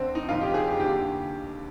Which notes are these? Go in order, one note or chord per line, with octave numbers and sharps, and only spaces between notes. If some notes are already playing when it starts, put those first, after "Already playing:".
Already playing: D2 D3 C4
D#4
F1 F2 D#3 F4
G4
G#4
G4
D#2 D3 G4